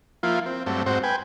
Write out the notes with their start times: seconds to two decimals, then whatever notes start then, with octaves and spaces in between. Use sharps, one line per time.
0.23 F3 A#3 E4 F4
0.46 C4
0.66 G2 F#3 A3 C4
0.86 G#2 C4 F#4 C5
1.03 B4 G5 G#5